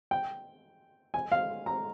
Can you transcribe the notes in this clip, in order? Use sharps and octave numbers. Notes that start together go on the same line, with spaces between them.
G5
G#5
F5
A#5